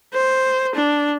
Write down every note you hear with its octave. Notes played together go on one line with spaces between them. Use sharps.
C5
D4